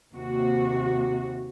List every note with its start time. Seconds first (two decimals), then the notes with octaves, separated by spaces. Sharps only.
0.13 D#2 C3 F#4